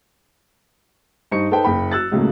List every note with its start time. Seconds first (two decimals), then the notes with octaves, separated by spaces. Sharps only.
1.31 G2 D#4 C5 C#6 C#7
1.51 D#4 A4 B4 C5 G5 A5
1.64 F#1 A#3 G5 B5
1.92 F#3 E6 F#6 A6
2.12 C#2 A2 C#3 F#3 A3 A#3